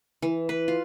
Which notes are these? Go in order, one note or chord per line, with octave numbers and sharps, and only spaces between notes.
E3
B4
F4